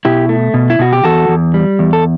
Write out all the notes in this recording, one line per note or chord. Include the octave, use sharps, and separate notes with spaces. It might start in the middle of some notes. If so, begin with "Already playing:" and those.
B2 E4 G4
A3
B2
E4
B2 F#4
G4
E2 F#4 A4
E2
G3
E2
A4